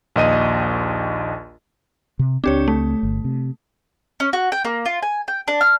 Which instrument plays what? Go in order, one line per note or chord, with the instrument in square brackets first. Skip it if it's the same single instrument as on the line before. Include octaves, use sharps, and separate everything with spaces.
[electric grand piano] A#1 D#2 D#5 D#7
[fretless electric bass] C3
[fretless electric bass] C#2 C4 [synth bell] D4 G4 C#5
[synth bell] A3
[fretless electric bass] G1
C3
[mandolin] C#4
F#4
G5
A#3
F4
G#5
G5
D4
F6